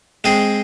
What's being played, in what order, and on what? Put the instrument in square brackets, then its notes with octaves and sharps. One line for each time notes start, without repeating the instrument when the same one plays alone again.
[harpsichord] G#3 C4 G#4